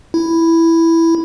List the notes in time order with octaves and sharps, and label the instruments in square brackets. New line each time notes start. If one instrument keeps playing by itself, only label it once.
[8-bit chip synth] E4